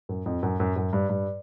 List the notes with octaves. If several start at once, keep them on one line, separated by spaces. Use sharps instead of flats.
F#2
F2
F#2
F#2
F#2
G2
G2